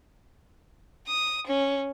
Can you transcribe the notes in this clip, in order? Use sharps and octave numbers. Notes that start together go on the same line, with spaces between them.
D#6
C#4